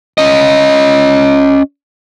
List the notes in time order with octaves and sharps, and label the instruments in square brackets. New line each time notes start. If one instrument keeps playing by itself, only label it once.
[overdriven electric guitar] C#4 D#5